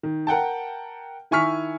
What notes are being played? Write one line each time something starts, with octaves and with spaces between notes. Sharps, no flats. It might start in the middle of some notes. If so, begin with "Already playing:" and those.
D#3
A#4 F#5 G5 A5
D#3 E4 G#5 C#6 F6 B6